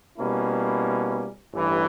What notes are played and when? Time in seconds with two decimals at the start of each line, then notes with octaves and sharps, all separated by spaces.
0.18 B2 G3 A#3 C#4 E4
1.54 A1 G2 E3